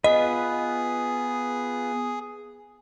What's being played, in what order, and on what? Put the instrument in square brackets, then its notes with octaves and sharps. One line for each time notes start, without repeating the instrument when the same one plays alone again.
[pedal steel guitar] B3 F4 B4 [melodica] G#4 [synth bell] D#5